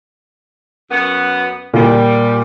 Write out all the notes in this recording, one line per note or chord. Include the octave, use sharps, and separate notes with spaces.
F#2 B3
A#2 G3